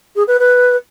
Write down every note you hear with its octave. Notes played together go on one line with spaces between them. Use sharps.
G#4
B4
B4